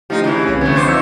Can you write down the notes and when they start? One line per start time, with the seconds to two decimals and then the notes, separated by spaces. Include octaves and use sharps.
0.10 F3 A3 D#4 E4 G4
0.24 C#3 E3
0.46 C2 C4 C#4
0.61 D3 A3 B3
0.76 F2 C5 C#6 D6 G#6
0.88 D#4 E6 C#7